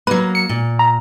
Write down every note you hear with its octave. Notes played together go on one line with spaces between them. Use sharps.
F#3 A#3 B4
C#7
A#2
A#5